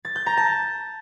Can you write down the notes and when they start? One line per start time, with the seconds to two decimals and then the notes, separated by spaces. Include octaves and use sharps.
0.05 A6
0.16 G6
0.26 A#5
0.37 A5